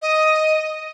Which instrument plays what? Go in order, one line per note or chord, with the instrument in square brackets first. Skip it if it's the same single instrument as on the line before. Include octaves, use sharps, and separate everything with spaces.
[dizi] D#5